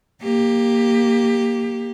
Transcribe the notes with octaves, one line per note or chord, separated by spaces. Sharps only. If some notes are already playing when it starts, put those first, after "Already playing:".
A#3 G4